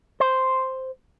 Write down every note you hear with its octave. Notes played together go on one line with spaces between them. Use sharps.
C5